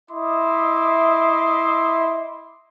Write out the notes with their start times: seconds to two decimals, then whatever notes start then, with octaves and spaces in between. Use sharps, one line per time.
0.11 E4 D#5 E5 C6 D6